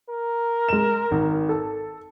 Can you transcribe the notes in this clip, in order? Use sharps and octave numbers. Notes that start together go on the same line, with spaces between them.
A#4
G#3 E7
G#1
A4